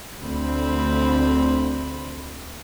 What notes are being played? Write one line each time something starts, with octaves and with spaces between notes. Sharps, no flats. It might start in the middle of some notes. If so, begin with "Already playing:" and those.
D2 C4 B5